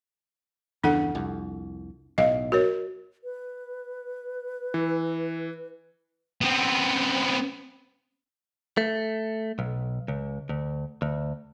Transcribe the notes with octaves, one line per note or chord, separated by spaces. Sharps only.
E2 G2 C#3 D4 A4 F#5
C2 F2
B1 A2 D#5 F5
F#4 A#4 C#5
B4
E3
B3 C4
A3
B1
C#2
D2
D2